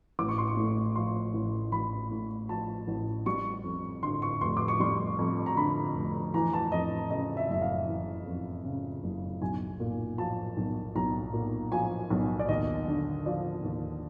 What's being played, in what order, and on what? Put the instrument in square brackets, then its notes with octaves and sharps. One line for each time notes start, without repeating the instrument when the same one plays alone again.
[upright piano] A1 D6
C#6
C6
C#6
A2
F3 C6
A1
A1 B5
A2
F3 A5
A1
G3 C#6
F2
D3 C6
C#6
F1 C6
D6
C#6
G3 C6
F2
A#5
D3 B5
F1
E3 A#5
A5
F2 D#5
C#3 D#5
E5
F#1 E5
F5
E3
F2
C#3
F#1
B1 G#5
A#2
F3 A5
B1
B1 A#5
A#2
F3 G#5
B1
D5
D#2 D#5
D3
F3 D5
D#2